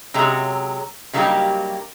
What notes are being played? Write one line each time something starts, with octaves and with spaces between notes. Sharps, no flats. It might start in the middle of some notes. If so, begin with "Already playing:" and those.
F#2 C3 F#3 G#3 A#5
C#3 F#3 G3 A#3 D#4 G4